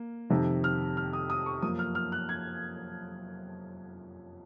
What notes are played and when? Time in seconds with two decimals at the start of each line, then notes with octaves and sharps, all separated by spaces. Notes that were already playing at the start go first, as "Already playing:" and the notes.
Already playing: A#3
0.30 F2 C3 D#3
0.64 F6
0.97 F6
1.13 D#6
1.30 D#6
1.46 C#6
1.62 F#2 F3 A#3 D#6
1.79 F6
1.95 F6
2.12 F#6
2.29 G#6